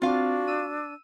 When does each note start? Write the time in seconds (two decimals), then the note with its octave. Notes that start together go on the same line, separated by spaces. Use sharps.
0.02 C4 D4 F4 F#4 F5
0.47 E6 D#7